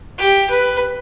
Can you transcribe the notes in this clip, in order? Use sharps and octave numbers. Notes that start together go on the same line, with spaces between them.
G4
B4